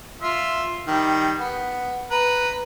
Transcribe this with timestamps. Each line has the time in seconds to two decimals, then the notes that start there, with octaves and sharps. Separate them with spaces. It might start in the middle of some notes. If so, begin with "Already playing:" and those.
0.22 F4 E5
0.87 D#3 G3
1.40 B3
2.11 B4 A#5